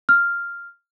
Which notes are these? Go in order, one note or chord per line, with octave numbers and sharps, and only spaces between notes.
F6